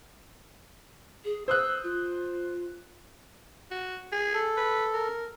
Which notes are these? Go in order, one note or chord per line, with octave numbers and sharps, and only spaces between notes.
G#4
C5 D#6 E6 F#6
F4
F#4
G#4
A4
B4
A#4